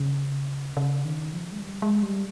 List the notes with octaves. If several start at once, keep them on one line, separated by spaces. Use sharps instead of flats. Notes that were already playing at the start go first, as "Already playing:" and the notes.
Already playing: C#3
C#3
D#3
F3
G#3
G3
G#3
G3